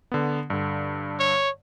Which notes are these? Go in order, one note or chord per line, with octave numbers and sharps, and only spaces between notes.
D3 B3
G2 D3
C#5